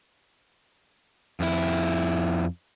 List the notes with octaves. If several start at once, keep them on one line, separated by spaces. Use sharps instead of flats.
F2 E4